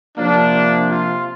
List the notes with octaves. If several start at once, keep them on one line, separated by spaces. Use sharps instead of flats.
C3 F3 A#3 D4
F4